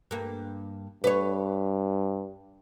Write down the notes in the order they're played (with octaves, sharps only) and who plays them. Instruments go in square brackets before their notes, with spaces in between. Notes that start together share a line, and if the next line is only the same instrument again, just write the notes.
[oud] G2 A#3
[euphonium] G2 [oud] B4 C#5